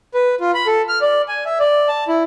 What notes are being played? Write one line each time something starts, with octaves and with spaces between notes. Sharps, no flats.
B4
F4
B5
A4
F6
D5
G#5
E5
D5
A5
E4